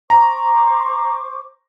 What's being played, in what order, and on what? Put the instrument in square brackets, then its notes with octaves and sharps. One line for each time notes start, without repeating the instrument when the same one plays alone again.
[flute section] C5 C#6 D6 [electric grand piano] A#5